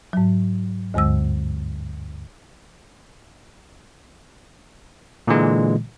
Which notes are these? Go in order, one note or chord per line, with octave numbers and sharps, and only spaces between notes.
G#2 F#3
D2 G2 D3 G#3 E6
A#2 D3 E3 G#3